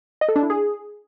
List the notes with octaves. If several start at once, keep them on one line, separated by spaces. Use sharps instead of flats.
D#5
A4
D4
E4
G#4